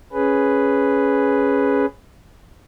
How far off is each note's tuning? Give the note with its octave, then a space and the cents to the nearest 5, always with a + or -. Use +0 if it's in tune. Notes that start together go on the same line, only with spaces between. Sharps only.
C#4 +0 G#4 +0 B4 +0